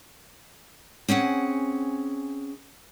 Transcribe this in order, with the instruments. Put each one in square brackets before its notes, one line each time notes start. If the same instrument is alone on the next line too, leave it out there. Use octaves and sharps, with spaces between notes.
[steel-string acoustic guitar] C4 C#4 G#4 F#5